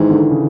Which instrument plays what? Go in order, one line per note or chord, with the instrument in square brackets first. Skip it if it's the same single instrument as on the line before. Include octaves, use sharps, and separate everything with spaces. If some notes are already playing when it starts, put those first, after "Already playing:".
Already playing: [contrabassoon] G#2 [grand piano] D#3 E3
[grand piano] D3
C#3